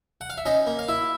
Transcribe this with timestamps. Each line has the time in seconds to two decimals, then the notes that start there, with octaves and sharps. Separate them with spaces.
0.21 F#5
0.30 F5
0.38 E5
0.46 C#4 D#4 D#5
0.67 A#3
0.79 F5
0.88 E4 E5